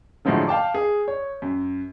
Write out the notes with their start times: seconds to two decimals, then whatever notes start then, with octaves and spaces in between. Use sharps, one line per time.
0.25 A2 D3 F3 F#3 G#3
0.47 F5 G5 A5 D6
0.74 G#4
1.08 C#5
1.42 F#2